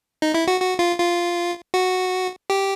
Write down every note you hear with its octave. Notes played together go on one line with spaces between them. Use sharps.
D#4
E4
F#4
F#4
F4
F4
F#4
G4